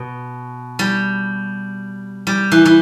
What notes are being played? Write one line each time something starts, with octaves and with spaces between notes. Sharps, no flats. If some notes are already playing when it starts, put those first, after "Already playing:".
Already playing: B2
G3
G3
E3
E3